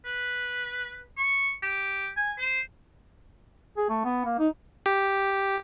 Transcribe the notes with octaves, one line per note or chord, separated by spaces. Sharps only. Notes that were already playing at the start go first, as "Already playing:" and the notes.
B4
C#6
G4
G#5
C5
G#4
A3
B3
A#3
D#4
G4